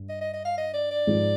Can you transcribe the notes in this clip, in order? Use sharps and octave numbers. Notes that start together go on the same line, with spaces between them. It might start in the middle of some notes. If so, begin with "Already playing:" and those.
Already playing: G2
D#5
D#5
D#5
F5
D#5
D5
D5
G#2 F3 G#3 D#4 G#4